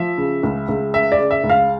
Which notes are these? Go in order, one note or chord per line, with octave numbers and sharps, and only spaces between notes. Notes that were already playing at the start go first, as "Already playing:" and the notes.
Already playing: F3 E5
C#3
C#2
C#2
C#3 E5
D5
C#3
E5
C#2
F5